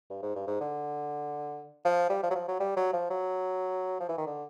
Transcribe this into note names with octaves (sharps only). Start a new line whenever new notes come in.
G2
G#2
G2
G#2
D3
F3
G3
F3
F#3
F3
F#3
G3
F#3
F3
F#3
F3
E3
D#3
D3